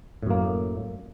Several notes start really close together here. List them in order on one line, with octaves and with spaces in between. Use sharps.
A2 F#2 A#3